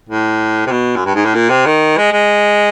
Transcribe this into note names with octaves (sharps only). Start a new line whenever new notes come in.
A2
C3
B2
F#2
G2
G#2
A2
A#2
C3
D#3
G#3
G#3